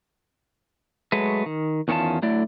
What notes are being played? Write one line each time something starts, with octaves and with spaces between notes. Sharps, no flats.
F#3 G#3 A3 B4
D#3
E2 D#3 C#4 E4 F4 A5
D3 F#3 A3 E4 D5